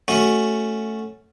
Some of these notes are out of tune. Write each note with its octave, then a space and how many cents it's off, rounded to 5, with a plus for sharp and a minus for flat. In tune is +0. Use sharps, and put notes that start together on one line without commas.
A3 +0 C#4 +0 F#4 +10